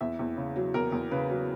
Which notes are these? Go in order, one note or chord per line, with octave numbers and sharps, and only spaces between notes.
E2 E5
E2
C#3
F#3
E2 A#4
E2
C#3 B4
F#3